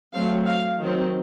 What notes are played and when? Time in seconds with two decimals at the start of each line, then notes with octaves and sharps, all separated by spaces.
0.14 F#3 A3 C4 F5
0.46 F5
0.79 D#3 F#3 C4